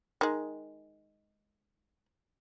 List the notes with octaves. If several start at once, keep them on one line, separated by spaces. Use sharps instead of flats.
D#3 G#3